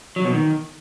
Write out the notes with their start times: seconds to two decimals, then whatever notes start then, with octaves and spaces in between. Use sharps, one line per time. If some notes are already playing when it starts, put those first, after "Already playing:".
0.16 F#3
0.25 B2
0.33 D#3